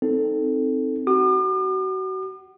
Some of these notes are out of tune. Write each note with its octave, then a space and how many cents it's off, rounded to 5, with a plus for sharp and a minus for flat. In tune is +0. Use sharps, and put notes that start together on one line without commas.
C4 +0 D#4 +0 A4 +0
F#4 +30 D6 +45